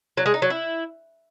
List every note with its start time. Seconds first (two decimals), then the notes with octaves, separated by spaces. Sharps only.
0.17 F#3
0.26 G#3
0.34 D#4
0.42 F#3
0.50 E4